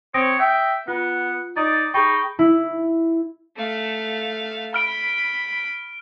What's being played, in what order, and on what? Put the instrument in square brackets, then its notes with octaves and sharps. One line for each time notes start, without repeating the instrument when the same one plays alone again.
[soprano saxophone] C4 [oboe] C#5 [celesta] D#6 A#6 D7
[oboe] E5 [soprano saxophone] G5
[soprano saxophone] B3 [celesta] F4 [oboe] F#5
[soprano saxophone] D#4 [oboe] D5 [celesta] D#6 A6
[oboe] D#4 [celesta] G#4 B5 C#6 [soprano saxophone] G5
[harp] E4
[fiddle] A3 F5
[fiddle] B5 [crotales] F6 D7